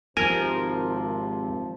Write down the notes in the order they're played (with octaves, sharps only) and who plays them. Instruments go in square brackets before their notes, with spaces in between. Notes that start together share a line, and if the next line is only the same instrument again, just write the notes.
[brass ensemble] G#1 C3 [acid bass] F3 [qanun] A#4 [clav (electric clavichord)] G#5